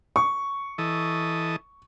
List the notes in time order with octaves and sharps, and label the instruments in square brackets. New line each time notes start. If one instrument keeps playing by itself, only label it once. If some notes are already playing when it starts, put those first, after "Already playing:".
[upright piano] C#6
[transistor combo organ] E3 A4 D#5